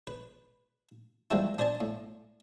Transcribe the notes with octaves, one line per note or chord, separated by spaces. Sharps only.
B4
E3 F3 G3 G#3 C4 E4
D4 C5 D5 G#5 A5
A2